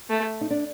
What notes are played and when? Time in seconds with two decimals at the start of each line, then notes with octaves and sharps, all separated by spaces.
0.09 A3
0.41 D#4
0.50 D4